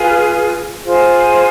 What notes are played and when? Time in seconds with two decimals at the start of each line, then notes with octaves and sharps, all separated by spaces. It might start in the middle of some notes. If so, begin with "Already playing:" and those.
Already playing: F4 G#4 B4
0.84 F4 G#4 C5